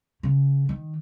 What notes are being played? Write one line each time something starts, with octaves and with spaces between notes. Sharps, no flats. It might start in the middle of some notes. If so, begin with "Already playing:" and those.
C#3
D#3